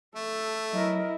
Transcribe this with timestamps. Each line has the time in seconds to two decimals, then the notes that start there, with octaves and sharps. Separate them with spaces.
0.16 A3 A4
0.73 F#3 E4 A#4 D#5